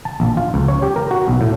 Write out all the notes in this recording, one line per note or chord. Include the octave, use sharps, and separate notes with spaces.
A5
A#1
F4
C#2
C#5
G4
A#4
F#4
B1
A2